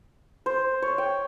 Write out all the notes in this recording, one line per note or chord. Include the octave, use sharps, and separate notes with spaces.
C5
C#5
G5